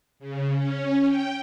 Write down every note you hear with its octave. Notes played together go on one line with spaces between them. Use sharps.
C#3
C#4
G5